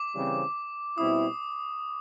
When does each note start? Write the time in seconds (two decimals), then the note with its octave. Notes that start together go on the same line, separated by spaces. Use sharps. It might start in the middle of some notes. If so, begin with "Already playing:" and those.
Already playing: D6
0.14 C#3 E3 G3 C4
0.98 B2 G3 C4 E4 D#6